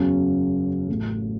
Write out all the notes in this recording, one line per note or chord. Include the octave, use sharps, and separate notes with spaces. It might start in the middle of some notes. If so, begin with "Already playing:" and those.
Already playing: F#1 E2 C#3 F#3 C#4
A1 A2 F#3 A3